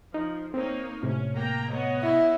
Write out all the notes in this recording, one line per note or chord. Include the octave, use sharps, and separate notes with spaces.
F3 D#4
A#3 C4 D#4 C#5
A2 C3 C#4
A#3 G5 A#5
B3 C#5 D#5
E4